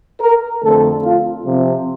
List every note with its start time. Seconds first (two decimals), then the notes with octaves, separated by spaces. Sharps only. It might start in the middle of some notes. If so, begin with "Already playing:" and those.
0.20 A#4
0.62 F2 D3 A3 C4 A4
1.02 F4
1.44 C3 F3 C4